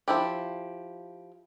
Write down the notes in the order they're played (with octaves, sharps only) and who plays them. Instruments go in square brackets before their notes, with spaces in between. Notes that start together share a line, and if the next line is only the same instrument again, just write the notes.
[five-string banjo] F3 E4 G4